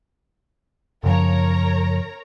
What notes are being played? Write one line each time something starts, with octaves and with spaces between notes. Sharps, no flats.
F#2 C#3 F3 A#4 C#5 A#5